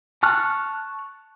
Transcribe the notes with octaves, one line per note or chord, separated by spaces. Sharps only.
A5 C#6 F6 F#6